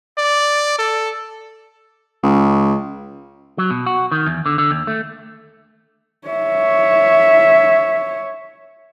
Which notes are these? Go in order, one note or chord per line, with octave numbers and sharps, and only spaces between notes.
D5
A4
C#2
F#3
B2
F#4
D#3
E2
D3
D3
D#2
A3
C#5 E5